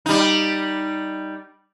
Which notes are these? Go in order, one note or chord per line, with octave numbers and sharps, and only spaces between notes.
G3 D#4